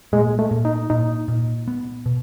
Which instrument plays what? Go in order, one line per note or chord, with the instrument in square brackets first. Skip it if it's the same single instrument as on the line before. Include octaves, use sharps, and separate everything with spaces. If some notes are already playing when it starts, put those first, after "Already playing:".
[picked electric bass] A#2 [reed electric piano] G#3
[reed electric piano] A3
[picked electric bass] A#2
[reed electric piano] D#4
[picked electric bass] A#2 [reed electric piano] D#4
[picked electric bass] A#2
B3
B2